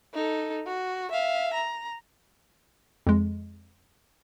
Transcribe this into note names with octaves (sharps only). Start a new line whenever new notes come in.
D#4 A4
F#4
E5 F5
A#5
F2 G#3